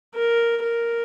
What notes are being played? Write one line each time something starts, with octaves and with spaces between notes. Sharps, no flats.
A#4
A#4